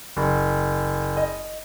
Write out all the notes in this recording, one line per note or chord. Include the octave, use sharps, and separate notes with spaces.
F#1
D#5